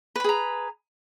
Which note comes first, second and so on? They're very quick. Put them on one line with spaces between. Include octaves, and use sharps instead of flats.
B4 B5 G#4 A#5